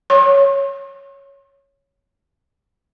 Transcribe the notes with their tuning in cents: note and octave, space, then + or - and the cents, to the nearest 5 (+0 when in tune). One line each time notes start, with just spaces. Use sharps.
C#5 +0 C6 +45